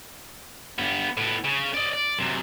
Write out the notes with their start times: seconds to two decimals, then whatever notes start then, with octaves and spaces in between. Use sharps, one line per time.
0.79 G2 B3
1.17 A2 B3
1.45 C#3
1.74 D5 D#5
1.94 D5
2.19 F#2 C3